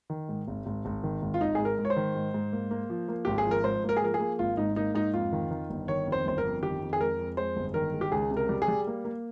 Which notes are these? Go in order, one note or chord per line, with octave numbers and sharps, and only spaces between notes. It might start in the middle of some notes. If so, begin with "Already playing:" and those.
D#3
G#2
G#1
G#1
G#1
D#3
G#1
F4
G#1 D#4
G#2 G#4
A#4
G#2
C#5
C5
D#3
G#2
G#2
A#3
A#3
F3
A#3
G#1 G4
G#4
F3
A#4
G#2 C5
A#3
A#4
G#4
F3 A#4
G#4
A#3
G#1 F4
G#2 D#4
A#3 D#4
G#2 D#4
F2 F4
D#3
D#3
G1
D#3 C#5
F2
C5
G1 C5
A#4
F2
D#3 G4
F2
G#4
G#3 A#4
F2
G#3 C5
G1
D#3 A#4
G#3
G4
C#2 G#4
C3
A#4
G3
G#4
G3
A#3
A#3